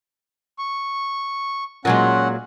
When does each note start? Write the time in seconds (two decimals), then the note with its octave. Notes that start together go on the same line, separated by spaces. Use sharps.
0.58 C#6
1.85 A#2 F#3 G#3 C#4 F#5